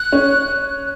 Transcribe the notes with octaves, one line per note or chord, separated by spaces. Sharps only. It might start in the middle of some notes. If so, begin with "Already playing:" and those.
Already playing: F#6
C#4